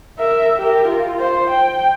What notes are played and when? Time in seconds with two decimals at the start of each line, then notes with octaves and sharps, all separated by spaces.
0.19 A#4 E5
0.58 G4 A#4
0.88 F4
1.20 C5
1.51 G5